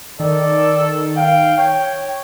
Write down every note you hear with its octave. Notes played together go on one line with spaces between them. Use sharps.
D#3 A4 D5
F5 G5
C#5 G5